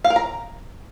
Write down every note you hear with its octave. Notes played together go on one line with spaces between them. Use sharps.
F5
A#4
A#5